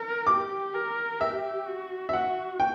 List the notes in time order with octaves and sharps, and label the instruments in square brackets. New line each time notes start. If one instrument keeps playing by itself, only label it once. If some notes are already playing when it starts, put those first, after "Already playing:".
Already playing: [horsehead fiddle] A#4
[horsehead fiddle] G4 [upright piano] D6
[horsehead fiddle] A#4
[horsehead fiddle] G4 [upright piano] E5
[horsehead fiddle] F#4
[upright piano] E5
[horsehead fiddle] F#4 [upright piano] F#5
[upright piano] G5